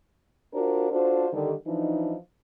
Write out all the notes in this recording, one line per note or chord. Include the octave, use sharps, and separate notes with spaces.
D4 F4 F#4 A#4 C5
D4 F4 F#4 A4 C5
D3 D#3 G3
E3 F3 D4 D#4